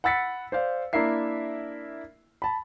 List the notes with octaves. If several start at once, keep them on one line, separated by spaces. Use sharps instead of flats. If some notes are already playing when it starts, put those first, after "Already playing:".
F#5 B5 E6 A6 B6 C#7
C5 D5 F5
A#3 D4 E4 A#4 E5 C7
A5 B5